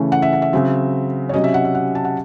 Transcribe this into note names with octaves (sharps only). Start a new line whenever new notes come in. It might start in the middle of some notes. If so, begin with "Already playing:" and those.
Already playing: C#3 E3 A3 C#4
F#5
E5
F#5
E5
C#3 F#3 C4
C#5
C3 F#3 C#4 D#5
E5
F#5
E5
F#5
A5
F#5